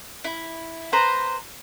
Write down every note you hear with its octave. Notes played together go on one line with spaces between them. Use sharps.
E4
B4 C5 A#5